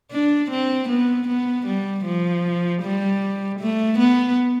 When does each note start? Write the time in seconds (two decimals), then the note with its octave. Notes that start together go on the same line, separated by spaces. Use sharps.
0.11 D4
0.51 C4
0.89 B3
1.28 B3
1.66 G3
2.05 F3
2.82 G3
3.60 A3
3.99 B3